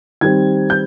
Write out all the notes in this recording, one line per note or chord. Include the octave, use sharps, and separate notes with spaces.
D#3 G3 C4 G#6
G6